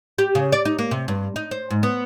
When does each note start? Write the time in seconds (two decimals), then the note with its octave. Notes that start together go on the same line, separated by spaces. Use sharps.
0.18 G4
0.35 C#3
0.52 D5
0.65 D#4
0.79 A#3
0.91 C3
1.08 G2
1.36 D#4
1.51 C5
1.70 G#2
1.83 B3